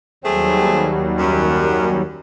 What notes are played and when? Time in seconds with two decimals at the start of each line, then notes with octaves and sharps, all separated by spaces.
0.24 D#2 F#3 G3 A3 C4 G#4
1.18 F#2